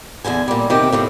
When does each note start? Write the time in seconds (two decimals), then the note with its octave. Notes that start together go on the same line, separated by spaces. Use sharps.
0.25 E2 G#2 D3 G#5
0.48 A#2 G3
0.70 C3 D#3 G4
0.92 F2 A2 C3